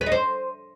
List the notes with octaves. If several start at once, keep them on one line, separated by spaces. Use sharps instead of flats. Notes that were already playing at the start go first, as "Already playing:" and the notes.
B4
D#4
C5